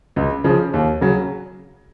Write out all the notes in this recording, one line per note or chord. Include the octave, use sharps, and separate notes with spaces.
C#2
C#3 F3
D#2
C#3 F#3